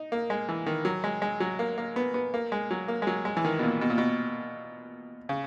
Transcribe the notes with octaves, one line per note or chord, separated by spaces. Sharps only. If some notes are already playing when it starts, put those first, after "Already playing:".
Already playing: D#4
A#3
G#3
E3
D#3
F#3
G#3
G#3
F#3
A#3
A#3
B3
B3
A#3
G#3
F#3
A#3
G#3
F#3
G#3
E3
D#3
B2
A#2
B2
A#2
B2
C#3